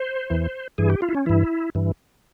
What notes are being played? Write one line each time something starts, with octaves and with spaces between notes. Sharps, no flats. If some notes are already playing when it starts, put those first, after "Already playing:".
Already playing: C5
E2 E3
G2 E3 G#4
G4
F4
E4
C#4
G2 E3 E4
G2 E3